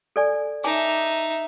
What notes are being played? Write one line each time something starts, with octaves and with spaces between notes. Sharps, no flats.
A4 D5 G#5
D#4 E5 G#5 A5 D6